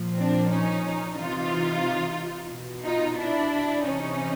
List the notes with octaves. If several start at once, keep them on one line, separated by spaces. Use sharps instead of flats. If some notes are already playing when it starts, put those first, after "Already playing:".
Already playing: A#2 F3
C4 D4
C#4 D#4
C3 E3 D#4 F4
B2
D#4 F4
D4 E4
C3 E3 C#4 D#4